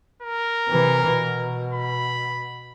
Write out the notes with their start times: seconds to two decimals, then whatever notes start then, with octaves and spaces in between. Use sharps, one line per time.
0.22 A#4
0.68 C3 E3
1.10 B2
1.74 B5